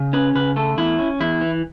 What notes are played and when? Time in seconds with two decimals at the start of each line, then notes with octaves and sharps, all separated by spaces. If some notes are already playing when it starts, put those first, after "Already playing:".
Already playing: C#3
0.13 C#4 B4
0.35 C#3 B4
0.56 A3 A4
0.78 E2 E4
0.99 C#4
1.20 E2 E4
1.41 E3